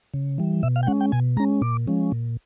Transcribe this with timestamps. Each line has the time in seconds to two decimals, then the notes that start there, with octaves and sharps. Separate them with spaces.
0.14 C#3
0.38 E3 G3
0.63 B2 E5
0.76 F5
0.83 G5
0.87 G#3 C#4 F#5
1.01 G5
1.12 B2 G#5
1.37 G#3 A#5
1.40 C#4
1.61 A#2 D6
1.87 F3 G#3 C#4
2.12 A#2